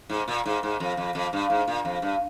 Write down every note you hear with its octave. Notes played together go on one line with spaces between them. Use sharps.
G#2
A#2
G#2
G#2
F2
F2
F2
G2
G#2
A#2
F2
G2